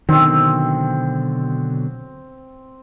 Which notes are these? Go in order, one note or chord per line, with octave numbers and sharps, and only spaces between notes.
B2 D3 D#3 F#3 C4